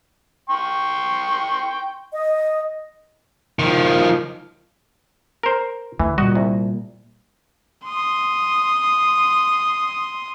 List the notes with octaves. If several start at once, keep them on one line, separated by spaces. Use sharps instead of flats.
G5 C6 C#6
D#5
D#3 F3
A#4 C5
D2 E3
A#2 G3 F#4 D#5
C2
C6 D#6